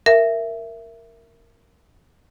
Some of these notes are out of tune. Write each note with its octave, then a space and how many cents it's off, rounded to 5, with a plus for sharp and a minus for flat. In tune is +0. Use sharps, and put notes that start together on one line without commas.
A#4 -5 E5 +10